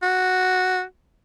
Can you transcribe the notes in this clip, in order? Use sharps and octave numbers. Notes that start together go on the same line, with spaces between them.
F#4